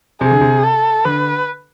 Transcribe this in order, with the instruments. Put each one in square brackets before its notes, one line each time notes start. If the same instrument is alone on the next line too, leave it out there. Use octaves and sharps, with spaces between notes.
[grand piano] C3 [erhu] G#4
[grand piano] D3
C3
[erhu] A4
[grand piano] D3 [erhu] B4